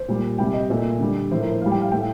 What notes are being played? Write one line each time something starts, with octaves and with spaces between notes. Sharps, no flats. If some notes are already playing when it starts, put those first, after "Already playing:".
Already playing: C5
A#2 G3
C3 G3 G5
D#5
A#2 A3 D5
D3 G3
A2 F3 A3 C5
A#4
C5
A2 G3 F5
G5
F5
A2 A3 G5